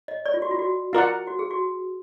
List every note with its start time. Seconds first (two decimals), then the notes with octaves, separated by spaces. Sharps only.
0.08 D#5
0.26 D5
0.34 F4
0.42 F#4
0.51 F4
0.59 F#4
0.93 F4 A#4 D5 F#5
1.27 F#4
1.39 G#4
1.51 F#4